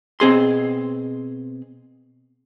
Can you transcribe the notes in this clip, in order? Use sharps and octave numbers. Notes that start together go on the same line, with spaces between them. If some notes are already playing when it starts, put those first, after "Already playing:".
B2 C4 G#4 C6